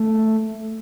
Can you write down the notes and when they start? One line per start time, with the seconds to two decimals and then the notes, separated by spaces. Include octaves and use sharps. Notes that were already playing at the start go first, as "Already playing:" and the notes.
Already playing: A3